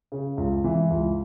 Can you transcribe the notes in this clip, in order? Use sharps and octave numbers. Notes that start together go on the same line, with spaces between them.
C#3
C#2
E3
C#2